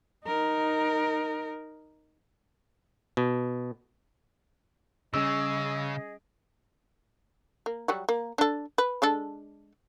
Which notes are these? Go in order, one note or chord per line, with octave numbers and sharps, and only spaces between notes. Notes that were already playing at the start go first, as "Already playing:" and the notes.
D#4 A#4
B2
C#3 G3 C#4 G#4 D#5 E6 D7
A#3
F#3 G3 F#4
A#3
D4 A4
B4
G#3 D4 A4